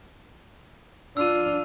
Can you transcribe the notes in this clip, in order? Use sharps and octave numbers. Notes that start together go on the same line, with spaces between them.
D4 F4 E6 D#7